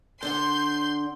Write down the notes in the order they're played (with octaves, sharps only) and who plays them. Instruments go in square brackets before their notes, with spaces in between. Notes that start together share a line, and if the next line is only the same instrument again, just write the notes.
[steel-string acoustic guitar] D3 D4 F#5 [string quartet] C6 G6